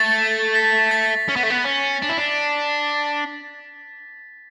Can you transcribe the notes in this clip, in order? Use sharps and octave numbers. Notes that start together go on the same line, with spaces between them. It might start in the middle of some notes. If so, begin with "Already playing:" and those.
Already playing: A3 A6
B6
A6
C#4
B3
A3
B3
C#4
D4
E4
D4